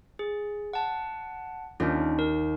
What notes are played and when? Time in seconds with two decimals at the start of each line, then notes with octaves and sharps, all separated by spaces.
0.19 G#4
0.73 F#5 A5
1.80 D#2 C#4 D4 F4 G4
2.19 A#4